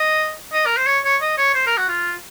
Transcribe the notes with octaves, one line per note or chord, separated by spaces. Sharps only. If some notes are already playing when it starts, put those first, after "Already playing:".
Already playing: D#5
D#5
A#4
C5
C#5
C#5
D#5
C#5
C5
A#4
F#4
F4